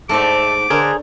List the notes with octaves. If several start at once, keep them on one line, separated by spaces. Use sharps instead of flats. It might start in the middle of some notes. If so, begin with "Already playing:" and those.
G#2 A3 A4 C5 D5 D6
D3 G#4 A#4 C5 C#5